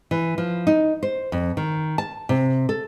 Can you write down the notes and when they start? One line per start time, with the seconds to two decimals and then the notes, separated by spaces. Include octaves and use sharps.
0.11 E3
0.38 F3
0.67 D#4
1.03 C5
1.32 F2
1.57 D#3
1.98 A5
2.29 C3
2.69 A4